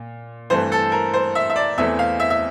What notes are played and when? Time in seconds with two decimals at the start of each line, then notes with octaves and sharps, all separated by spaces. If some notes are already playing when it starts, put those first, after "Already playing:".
Already playing: A#2
0.50 G2 E3 A3 C4 C5
0.72 A4
0.92 A#4
1.14 C5
1.35 E5
1.50 E5
1.56 D5
1.78 E2 E3 A3 C4 E5
1.99 F5
2.20 E5
2.30 E5